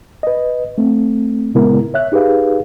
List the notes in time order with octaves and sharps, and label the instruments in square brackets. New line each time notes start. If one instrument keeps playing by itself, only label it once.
[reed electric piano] B4 D#5
A3 C4
A#2 C#3 G#3 B3 E4 A#4
C#5 E5 F#6
D#4 G4 G#4 B4 F5